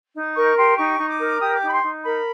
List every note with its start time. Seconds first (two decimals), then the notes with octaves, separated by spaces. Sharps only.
0.14 D#4
0.35 A#4 C#6
0.56 G4 C6
0.77 D#4 C#6
0.99 D#4
1.09 D6
1.19 A#4
1.41 G4 D#6
1.56 D6
1.61 D#4
1.68 B5
1.73 C6
1.82 D#4
2.03 A#4 B5